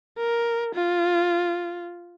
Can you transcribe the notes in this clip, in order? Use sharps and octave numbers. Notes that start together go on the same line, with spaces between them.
A#4
F4